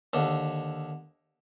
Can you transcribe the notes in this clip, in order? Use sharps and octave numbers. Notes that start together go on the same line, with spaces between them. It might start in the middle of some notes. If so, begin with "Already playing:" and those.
D#2 D3